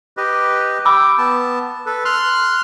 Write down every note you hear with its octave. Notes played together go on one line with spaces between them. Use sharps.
G4 B4 D#5
G5 B5 D6 E6
B3 A5
A4 B4
C6 F6 F#6